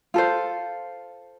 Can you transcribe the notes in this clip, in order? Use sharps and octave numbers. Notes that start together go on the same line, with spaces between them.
F4 A4 C5